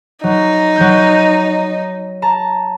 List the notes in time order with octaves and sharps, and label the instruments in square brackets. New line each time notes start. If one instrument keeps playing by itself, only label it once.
[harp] F#3 [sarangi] D#4
[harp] F#3 G6
A5 A#5